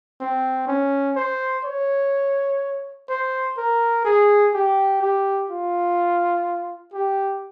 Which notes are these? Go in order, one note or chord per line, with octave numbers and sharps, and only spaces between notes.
C4
C#4
C5
C#5
C5
A#4
G#4
G4
G4
F4
G4